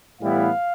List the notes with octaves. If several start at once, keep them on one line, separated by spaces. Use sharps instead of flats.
A2 E3 G3 B3 E4 F5